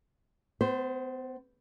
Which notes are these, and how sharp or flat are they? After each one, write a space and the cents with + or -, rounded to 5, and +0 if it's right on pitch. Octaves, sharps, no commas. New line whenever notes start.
B3 +40 C5 +0